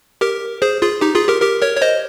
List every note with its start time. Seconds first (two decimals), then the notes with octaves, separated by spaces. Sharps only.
0.21 G4 A#4
0.62 G#4 C5
0.82 F4 G#4
1.01 D#4 G4
1.15 F4 G#4
1.28 G4 A#4
1.41 G4 A#4
1.61 A#4 C#5
1.77 C#5
1.82 C5 D#5